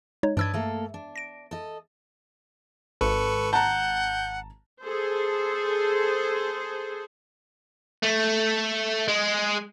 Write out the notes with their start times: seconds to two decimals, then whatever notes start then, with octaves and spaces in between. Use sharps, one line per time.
0.23 G#3 D#4 C#5
0.37 G2 D4 B4 D#5 E6 G#6
0.54 A3 A#3 A4
0.94 D4
1.16 A#6 D7
1.51 A4 D#5
3.01 G#1 A4 B4 C#6
3.53 F#5 A5 A#5 G6
4.83 G#4 A4 C5
8.03 A3
9.08 G#3